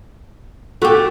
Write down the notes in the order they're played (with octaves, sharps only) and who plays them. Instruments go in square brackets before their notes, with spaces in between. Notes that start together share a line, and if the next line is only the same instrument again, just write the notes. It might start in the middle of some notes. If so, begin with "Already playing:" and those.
[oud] A3 G4 [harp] F#4